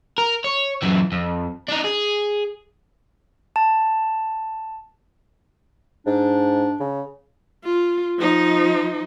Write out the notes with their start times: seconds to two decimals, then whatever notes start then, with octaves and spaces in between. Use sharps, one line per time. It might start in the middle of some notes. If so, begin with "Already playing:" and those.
0.18 A#4
0.44 C#5
0.82 F#2 E3
1.12 F2
1.68 D4 D#4
1.84 G#4
3.56 A5
6.06 G#2 D4
6.80 C#3
7.64 F4
8.18 F3 D#4